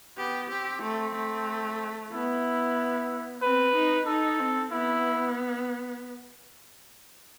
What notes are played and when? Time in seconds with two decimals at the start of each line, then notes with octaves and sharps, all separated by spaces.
0.18 B3 G4
0.50 C4 G4
0.82 A3
1.15 A3
2.12 B3 E4
3.42 C4 B4
3.74 D#4
4.06 D#4 A4
4.39 C4
4.71 B3 E4